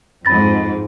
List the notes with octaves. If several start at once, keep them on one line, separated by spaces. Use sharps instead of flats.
F2 G#2 B5 A6 A#6